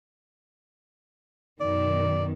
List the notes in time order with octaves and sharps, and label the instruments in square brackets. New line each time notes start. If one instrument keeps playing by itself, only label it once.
[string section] F#2 B2 D#3 [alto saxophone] D5